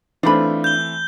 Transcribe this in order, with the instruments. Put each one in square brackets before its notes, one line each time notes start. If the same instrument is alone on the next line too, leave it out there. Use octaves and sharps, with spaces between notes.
[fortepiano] E3 A3 C4 [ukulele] D4 F4 B5
[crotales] G6 G7